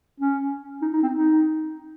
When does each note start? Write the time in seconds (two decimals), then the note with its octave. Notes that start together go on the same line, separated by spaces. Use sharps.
0.21 C#4
0.82 D#4
0.93 D#4
1.03 C4
1.13 D#4